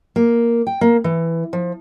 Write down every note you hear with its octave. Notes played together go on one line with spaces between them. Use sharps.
A#3
G5
A#3
E3
F3